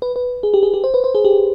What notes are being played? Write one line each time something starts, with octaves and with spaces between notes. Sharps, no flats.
B4
B4
G#4
G4
G#4
G4
C5
B4
C5
G#4
G4